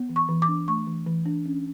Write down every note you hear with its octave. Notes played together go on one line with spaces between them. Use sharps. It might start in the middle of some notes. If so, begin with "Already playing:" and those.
Already playing: B3
E3
C#6
E3
D6
D4
A3 C#6
E3
E3
D4
C#4